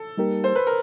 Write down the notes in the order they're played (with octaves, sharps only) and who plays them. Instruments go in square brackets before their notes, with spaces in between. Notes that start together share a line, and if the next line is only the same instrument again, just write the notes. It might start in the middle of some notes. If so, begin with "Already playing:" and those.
Already playing: [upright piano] A4
[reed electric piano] G3 A#3 D#4 G4 A#4
[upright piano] C5
B4
A#4